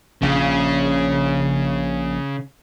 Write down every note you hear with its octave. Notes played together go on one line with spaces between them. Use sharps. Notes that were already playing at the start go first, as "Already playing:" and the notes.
A#1 C#3